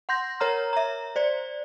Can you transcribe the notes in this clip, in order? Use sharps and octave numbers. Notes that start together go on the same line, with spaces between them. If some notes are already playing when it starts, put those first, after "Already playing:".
F#5 C6 G6 A#6
A#4 C#5 A#5 F6
E5 A#5
C5 D5